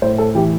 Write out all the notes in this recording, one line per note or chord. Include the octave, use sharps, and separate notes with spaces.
A2 C5
A4
E3 G4